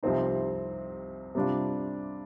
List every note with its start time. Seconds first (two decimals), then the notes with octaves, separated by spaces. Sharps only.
0.03 C2 C3 F3 C4 D#4
1.35 C3 G3 D4 F4